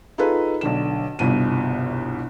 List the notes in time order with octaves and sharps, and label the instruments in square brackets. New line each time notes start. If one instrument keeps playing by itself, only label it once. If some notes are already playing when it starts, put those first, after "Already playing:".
[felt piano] D#4 F4 G#4 A4 B4
B1 D3 E7
G1 C2 B2 D#7